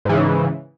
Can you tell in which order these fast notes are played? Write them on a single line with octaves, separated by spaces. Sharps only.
G#2 E3 C#3